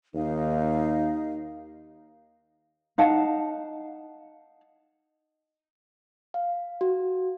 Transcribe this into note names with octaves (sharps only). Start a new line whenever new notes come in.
D#2 D#4 F5
D#4 F5 F#5 A5
F5
F#4